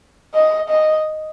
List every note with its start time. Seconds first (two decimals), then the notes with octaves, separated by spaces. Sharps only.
0.34 D#5
0.69 D#5